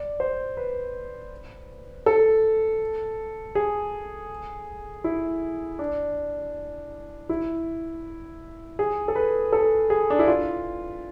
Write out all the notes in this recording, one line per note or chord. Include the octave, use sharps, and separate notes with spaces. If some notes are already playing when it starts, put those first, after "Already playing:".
Already playing: D5
C5
B4
A4
G#4
E4
D4
E4
G#4
A4
B4
A4
G#4
D4
E4
F4